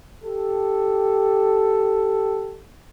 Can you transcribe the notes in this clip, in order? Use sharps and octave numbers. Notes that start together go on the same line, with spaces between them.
G4 A4